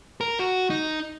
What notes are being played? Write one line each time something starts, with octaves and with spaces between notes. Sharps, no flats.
A#4
F#4
D#4